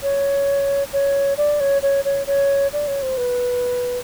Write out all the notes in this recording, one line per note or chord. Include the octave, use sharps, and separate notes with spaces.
C#5
C#5
D5
C#5
C#5
C#5
C#5
D5
C#5
C5
B4